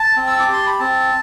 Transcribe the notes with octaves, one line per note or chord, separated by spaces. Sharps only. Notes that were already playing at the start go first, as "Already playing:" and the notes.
Already playing: A5
C4
E6
D6
G4 C6
B5
C4 A5